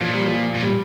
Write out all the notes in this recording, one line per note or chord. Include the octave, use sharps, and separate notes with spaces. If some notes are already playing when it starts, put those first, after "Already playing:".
A#2 F3
G3
F3
A#2
G3